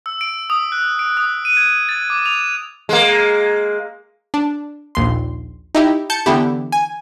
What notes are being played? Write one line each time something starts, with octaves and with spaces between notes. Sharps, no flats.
E6
D7
D#6
F#6
D7
D#6
D#7
G#6
A6
D6
F7
G#3 A#3
D4
A#1 D#2 C6
D#4 E4 G4
A5 G6 C#7
D3 E3 B3 E4 G4
G#5